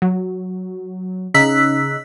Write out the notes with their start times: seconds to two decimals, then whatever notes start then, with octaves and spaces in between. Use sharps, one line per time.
0.02 F#3
1.34 C#3 D#4 E6 F#6 B6